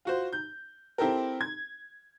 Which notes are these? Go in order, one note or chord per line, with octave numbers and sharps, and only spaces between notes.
F4 F#4 C5
G6
C4 E4 G4 A4 A#4
G#6